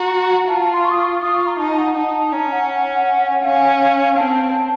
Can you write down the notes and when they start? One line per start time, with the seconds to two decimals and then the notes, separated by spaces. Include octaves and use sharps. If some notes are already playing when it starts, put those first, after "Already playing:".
Already playing: F#4 A#5
0.48 F4 A5
0.60 A5
0.72 C6
0.84 C#6
0.91 D#6
0.97 C#6
1.09 C#6
1.22 F4 D#6
1.34 C#6
1.46 A#5
1.59 D#4 A5
1.70 A5
1.77 F#5
1.95 D#4 A5
2.33 C#4 A#5
2.52 F#5
3.43 C#4 F5
4.17 C4 A5